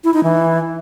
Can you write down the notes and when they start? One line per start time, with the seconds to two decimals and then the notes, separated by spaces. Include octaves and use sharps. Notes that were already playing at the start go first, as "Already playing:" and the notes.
0.04 E4
0.14 D#4
0.23 E3